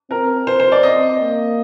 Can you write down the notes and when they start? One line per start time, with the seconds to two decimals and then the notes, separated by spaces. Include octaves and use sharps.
0.10 C4 A#4
0.47 C5
0.60 C5
0.72 D5
0.83 C4 D#5
1.20 A#3